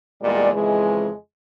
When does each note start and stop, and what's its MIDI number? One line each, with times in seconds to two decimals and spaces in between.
0.22 0.51 40
0.22 0.51 46
0.22 0.51 55
0.22 0.51 56
0.22 0.51 74
0.53 1.10 41
0.53 1.10 49
0.53 1.10 52
0.53 1.10 56